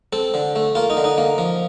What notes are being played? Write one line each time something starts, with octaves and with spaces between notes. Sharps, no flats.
C4 A4
D3
A3
A#3 F4
D#4
D3
D#4
A#3
F3